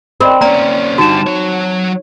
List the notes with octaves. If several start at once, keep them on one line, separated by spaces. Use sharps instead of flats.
C4 A#4 D5 D#5 B5
A#3 C#4 D5 A#5
D3 G3 D#4 F#4 A5 E7
F#3 C#5